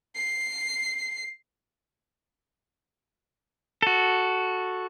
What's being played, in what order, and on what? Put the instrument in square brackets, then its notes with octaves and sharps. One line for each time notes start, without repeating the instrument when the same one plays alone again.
[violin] C7
[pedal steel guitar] F#4 A4